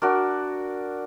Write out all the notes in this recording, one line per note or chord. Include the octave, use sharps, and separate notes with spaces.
D4 F#4 A#4 D5